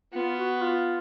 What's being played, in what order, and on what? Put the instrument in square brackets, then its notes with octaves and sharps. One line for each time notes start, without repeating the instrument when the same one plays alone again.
[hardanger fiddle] B3 [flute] F4
[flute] F#4
F4